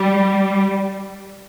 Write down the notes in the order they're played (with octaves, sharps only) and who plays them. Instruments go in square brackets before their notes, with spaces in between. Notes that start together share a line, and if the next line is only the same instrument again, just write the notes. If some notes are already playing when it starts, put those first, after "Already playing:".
Already playing: [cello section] G3